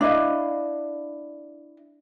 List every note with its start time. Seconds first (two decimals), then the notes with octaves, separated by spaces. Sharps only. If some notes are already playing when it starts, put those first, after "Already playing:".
0.01 D4 E4 D#5 F5